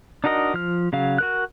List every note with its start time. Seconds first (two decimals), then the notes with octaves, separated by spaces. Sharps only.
0.24 D4 D#4 F#4 A#4 D#5
0.54 F3 F6
0.93 C#3 F#3 F5
1.18 F#4 A#4 F#6